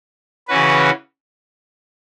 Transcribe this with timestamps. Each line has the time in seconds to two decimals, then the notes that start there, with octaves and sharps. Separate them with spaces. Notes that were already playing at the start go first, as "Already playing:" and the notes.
0.48 C#3 E3 C#4 F#4 B4